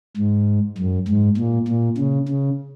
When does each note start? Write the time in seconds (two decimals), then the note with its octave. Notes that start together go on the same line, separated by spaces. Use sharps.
0.17 G#2
0.78 F#2
1.08 G#2
1.38 A#2
1.68 A#2
1.98 C#3
2.29 C#3